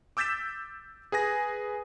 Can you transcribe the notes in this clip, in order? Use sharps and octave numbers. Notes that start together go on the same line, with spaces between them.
D6 E6 G6 A6 B6 E7
G#4 B4 G#5 A#6